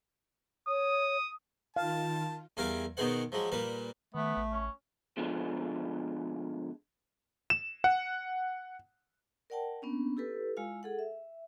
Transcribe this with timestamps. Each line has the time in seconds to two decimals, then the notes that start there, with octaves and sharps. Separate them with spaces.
0.68 C#5 D#6
1.76 D#3 F4 F5 A5
2.57 E2 G3 A#4 F5 G#5 D6
2.97 B2 D#3 B3 G#4 C5 F#5
3.32 F3 F#3 G#3
3.52 A#2 G3 A#4 B4
4.14 D#3 A3 B3
4.37 A1
4.52 C#4
5.17 B2 D3 F3 G#3
7.50 E7
7.84 F#5
9.50 A#4 D5 F#5 G5 A5
9.82 A#3 B3 C#4 D4
10.17 E4 G4 A4 B4
10.57 G#3 E4 F4 F5
10.83 G#4 A4 F#5
10.99 E5